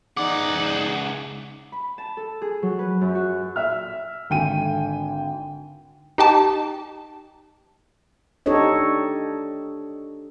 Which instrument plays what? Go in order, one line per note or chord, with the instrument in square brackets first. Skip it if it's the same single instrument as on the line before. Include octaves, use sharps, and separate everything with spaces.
[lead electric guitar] C#2 F#5 [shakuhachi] D#4 [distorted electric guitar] G#4 D5 [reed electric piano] D6
[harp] B5
A5
A4
G#4
F#3
B4
F#2
F#4
[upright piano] E5 F6
G#1 D3 G5 G#5 D#7
[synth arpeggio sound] D#4 G4 G5 A5
[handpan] D4 D#4 G4 A4 C#5 D#5